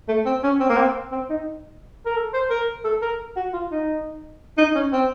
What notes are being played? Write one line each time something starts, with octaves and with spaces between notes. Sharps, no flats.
A3
C4
C#4
C4
A#3
C4
C4
D#4
A#4
A4
C5
A#4
A4
A#4
F#4
F4
D#4
D#4
C#4
C4